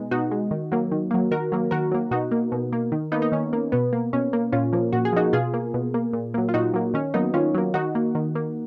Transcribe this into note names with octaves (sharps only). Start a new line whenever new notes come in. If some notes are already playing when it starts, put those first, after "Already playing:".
Already playing: B2 G#3 B3 D#4
B2 D#4 F#4
G#3
D#3
F#3 A#3
D#3
F#3 A#3
D#3 F#4 A#4
F#3 A#3
D#3 F#4 A#4
F#3 A#3
B2 D#4 F#4
A#3
B2
A#3
D#3
A#3 B3 D#4
D#4
D#3 C#4
A#3
B2 B3
A#3
B2 C#4
A#3
A#2 C#4 F4
F3 A#3
A#2 F#4
G#4
F3 A#3 D#4 F#4
B2 F4 G#4
A#3
B2
A#3
A#2
F#3 A#3
F4
A#2 D#4 F#4
F#3 A#3
D#3 C#4
F#3 A#3 B3 D#4
D#3 C#4 F4
F#3 A#3
D#3 D#4 F#4
A#3
D#3
A#3